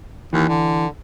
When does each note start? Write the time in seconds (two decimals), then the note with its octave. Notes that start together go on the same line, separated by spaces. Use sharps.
0.33 D#2 E3
0.49 D3